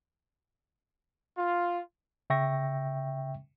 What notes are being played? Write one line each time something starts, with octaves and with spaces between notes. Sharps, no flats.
F4
C#3 E5 G5 C#6 A#6